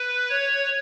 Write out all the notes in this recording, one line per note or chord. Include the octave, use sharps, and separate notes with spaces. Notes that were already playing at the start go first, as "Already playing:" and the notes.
Already playing: B4
C#5